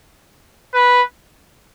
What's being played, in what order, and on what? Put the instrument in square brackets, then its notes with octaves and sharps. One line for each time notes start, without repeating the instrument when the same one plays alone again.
[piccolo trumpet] B4